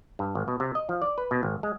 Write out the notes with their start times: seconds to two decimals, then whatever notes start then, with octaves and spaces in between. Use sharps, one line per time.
0.19 G2
0.35 G#1
0.48 B2
0.60 C3
0.75 D#5
0.89 F3
1.02 D5
1.18 B4
1.31 B2
1.43 G#1
1.63 G#3